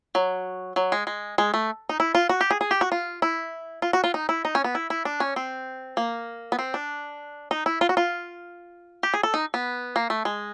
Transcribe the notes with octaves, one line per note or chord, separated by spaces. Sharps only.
F#3
F#3
G#3
G#3
G#3
A3
D#4
E4
F4
F#4
G4
G#4
G#4
G4
F#4
F4
E4
F4
F#4
F4
D#4
E4
D#4
C#4
B3
E4
E4
D4
C#4
C4
A#3
B3
C4
D4
D#4
E4
F4
F#4
F4
G4
G#4
A4
D#4
B3
A#3
A3
G#3